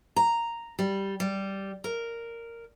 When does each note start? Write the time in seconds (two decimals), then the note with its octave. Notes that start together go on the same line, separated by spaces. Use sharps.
0.16 A#5
0.79 G3
1.20 G3
1.84 A#4